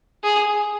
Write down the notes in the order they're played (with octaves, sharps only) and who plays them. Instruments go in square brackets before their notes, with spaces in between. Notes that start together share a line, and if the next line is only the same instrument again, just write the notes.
[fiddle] G#4